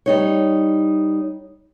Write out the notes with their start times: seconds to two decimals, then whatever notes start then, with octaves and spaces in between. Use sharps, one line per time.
0.06 G3 D#4 C#5